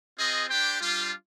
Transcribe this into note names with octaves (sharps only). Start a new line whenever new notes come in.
C4 F4 G#4 D#5
D4 G4 C5 G5
G3 D4 F4